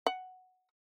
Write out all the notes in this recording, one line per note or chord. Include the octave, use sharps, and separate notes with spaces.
F#5